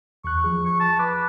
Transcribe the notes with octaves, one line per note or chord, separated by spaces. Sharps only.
E2 C#6 F#6
F3 G#4
C#6
A5
B4 D6